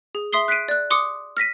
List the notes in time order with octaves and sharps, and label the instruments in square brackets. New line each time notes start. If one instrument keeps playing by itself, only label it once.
[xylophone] G#4
E5 C6 D#6 C7 G7
F#6 B6 C7 D7 D#7
D5 F#6
C6 D6 D#6 C#7
F6 A#6 B6 D#7